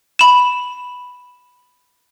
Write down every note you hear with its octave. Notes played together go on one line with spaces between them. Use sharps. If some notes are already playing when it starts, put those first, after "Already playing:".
B5 E7